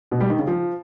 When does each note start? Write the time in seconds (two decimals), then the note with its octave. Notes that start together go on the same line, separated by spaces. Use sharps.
0.11 B2
0.20 G3
0.29 D#3
0.38 C#3
0.47 F3